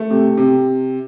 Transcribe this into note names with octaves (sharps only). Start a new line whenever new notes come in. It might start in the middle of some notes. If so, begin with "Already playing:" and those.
Already playing: A3
C3
C3